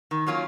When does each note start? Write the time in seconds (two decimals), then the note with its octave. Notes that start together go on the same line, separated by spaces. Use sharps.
0.11 D#3
0.26 F#3 A#3 C#4 F4